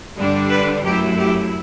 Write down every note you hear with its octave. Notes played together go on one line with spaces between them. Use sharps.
G2 D3 G3 D4
B4 D5
F#2 F#3 A3 E4 G4
G4